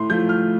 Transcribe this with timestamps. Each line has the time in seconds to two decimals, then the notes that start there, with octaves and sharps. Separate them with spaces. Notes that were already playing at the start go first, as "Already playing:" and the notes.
Already playing: A2 C6
0.10 F3 A3 F4 G6
0.29 F6